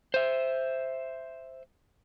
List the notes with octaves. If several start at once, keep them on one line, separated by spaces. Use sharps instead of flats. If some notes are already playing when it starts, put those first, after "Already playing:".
C5 E5